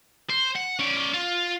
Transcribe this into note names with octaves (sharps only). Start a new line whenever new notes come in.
C5
F#5
C#4 D5
F4